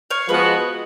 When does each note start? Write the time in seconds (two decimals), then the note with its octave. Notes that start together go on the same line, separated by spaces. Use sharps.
0.10 C#5 F5
0.29 F3 G#3 B3 F#4 B4 D#5